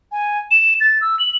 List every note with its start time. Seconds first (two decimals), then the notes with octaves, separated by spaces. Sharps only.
0.12 G#5
0.51 E7
0.81 A6
1.01 E6
1.19 F#7